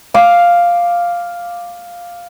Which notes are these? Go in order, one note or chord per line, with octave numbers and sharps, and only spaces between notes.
F5 D6